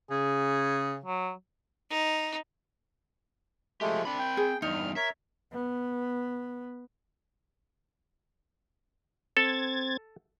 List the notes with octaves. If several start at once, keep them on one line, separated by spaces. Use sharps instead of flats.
C#3 G#4
F#3
D#4
F3 G#3 A3 G4
C4 D4 B5
G5
G#4
E2 G2 D#4 F6
A#4 C#5 E5
B3
C4 A4 G#6 A6